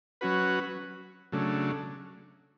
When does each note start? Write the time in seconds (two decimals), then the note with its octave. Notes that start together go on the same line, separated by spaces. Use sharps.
0.21 F#3 C#4 F#4 B4
1.32 C#3 F#3 A3 D4